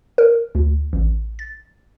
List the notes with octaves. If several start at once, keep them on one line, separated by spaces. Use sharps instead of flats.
A#4
D2
A1
A6